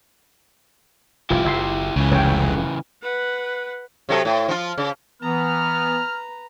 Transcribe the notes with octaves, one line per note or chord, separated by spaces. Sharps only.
F1 C2 G#2 E4 F4 G4 D6
F#1 E5 C6
C#2 C#3 E3
F1 F2 C#5 G5
B4 F#5
C3 F#3 A4
A2
F3 F4
C#3
E3 B3 B4 A#5 F6